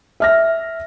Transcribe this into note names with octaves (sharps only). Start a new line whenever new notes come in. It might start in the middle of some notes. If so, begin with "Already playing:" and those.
E5 F6 A#6